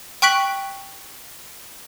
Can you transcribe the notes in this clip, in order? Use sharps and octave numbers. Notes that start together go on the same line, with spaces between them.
G5 C#6 F#6 B6 D7 F#7